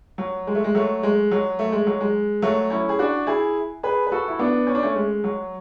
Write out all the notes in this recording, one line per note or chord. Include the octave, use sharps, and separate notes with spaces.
F#3
G#3
A3
G#3
F#3 A3
G#3
F#3
A3
G#3
F#3
G#3
F#3 A3
C#4 E4
G#4
D4 F#4
E4 G#4
G#4 B4
B4
F#4 A4
E4
B3 D4
C#4
D4
A3 C#4
G#3
F#3